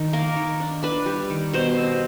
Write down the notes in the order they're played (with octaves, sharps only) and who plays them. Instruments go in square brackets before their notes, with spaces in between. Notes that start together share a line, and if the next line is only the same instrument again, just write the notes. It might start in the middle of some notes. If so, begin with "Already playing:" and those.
Already playing: [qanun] D#3
A#3 A#4
D#3
D4
D4 B4
G3
D#3
B2 C5
C4